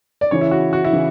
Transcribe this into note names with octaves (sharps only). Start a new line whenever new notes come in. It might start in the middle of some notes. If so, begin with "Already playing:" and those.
D5
C#3 E3 C#5
E4
F#4
F#4
E4
C#3 E3